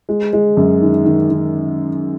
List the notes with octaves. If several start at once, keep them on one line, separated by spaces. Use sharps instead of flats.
G#3
G#3
F#2
D#3
D#3
D#3